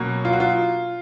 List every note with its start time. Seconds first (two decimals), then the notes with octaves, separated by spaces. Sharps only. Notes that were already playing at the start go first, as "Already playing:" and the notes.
Already playing: B2 F#3 A#3 C#4
0.25 F4
0.33 F#4
0.40 F4